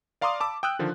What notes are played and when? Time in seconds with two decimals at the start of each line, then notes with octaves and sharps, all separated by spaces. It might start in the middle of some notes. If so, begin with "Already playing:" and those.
0.21 D5 F5 A#5 C6 D6 D#6
0.40 A5 B5 D6 E6
0.63 G5 D#6 E6 F#6
0.79 D3 D#3 F3